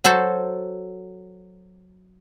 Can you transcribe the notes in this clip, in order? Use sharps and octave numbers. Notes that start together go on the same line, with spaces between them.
F#3 F#4 A4 C5 A5